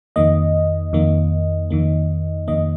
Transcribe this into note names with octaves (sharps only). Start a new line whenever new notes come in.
F2 D#3 A#3 D#5
F2 D#3 A#3
F2 D#3 A#3
F2 D#3 A#3 D#5